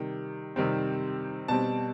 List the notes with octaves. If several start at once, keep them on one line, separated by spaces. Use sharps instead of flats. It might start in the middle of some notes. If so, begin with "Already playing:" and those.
Already playing: C3 D#3 G3
C3 D#3 G3 C4
B2 G3 C4 A5